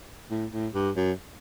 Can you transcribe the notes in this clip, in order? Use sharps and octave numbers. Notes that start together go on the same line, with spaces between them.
A2
A2
G2
F#2